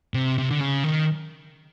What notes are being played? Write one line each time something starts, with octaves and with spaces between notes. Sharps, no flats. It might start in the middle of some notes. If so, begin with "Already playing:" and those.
C3
C3
D3
C#3
D#3